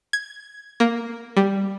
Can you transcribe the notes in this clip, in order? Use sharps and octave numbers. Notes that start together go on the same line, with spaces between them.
G#6
A#3
G3